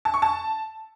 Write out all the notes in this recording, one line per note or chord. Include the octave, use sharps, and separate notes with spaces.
A5
C#6
A5